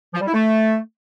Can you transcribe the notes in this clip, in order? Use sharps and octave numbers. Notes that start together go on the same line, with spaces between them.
F3
G3
E4
A3